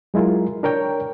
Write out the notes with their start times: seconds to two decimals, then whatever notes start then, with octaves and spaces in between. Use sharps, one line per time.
0.14 F#3 G#3 E4 F4 A#4
0.63 D4 A#4 C#5 G5